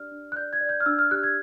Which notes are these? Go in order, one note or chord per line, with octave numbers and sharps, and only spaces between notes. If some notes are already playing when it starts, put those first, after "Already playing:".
Already playing: D4 G4 D5 F6
D4
F#6
D5 G6
G#6
D5
G6
F6
D4 E6
F6
G4 F#6
G#6